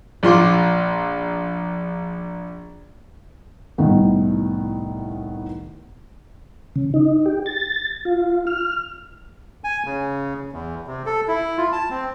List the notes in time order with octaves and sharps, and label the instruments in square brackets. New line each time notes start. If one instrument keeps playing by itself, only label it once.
[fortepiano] A#1 F4 C6 D6
[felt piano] C2 A2 D#3 B3
[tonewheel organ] C#3
D#4
G4
A6
F4
F6
[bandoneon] G#5
C#3
E2
C3
A4
E4
F4
A5
C4